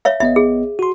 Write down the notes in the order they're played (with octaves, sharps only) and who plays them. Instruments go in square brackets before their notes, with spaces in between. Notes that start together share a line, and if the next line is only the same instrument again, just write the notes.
[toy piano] C#5 E5 F5
[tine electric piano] A1 B3 D#5 [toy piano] E5
[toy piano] G#4
[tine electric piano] F#4 C6